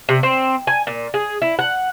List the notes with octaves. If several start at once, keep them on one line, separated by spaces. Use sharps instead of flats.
C3
C4
G#5
A#2
G#4
E4
F#5